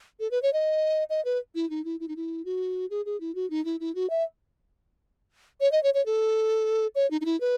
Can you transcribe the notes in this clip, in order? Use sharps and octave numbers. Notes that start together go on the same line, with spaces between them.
A4
B4
C#5
D#5
D#5
B4
E4
D#4
E4
E4
D#4
E4
F#4
G#4
G#4
E4
F#4
D#4
E4
E4
F#4
E5
C#5
D#5
C#5
C#5
A4
C#5
D#4
D#4
E4
B4